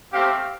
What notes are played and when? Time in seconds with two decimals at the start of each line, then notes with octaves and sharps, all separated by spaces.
0.13 A3 C4 G4 F5